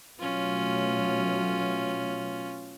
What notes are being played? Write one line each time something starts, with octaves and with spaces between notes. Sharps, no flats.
B2 F#3 A3 C#4 F4